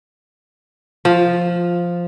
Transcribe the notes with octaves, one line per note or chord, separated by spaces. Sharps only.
F3